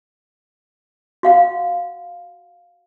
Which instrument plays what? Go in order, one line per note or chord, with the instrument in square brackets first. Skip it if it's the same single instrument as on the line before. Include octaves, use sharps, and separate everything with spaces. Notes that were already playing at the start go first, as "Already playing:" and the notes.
[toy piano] F#4 F5 F#5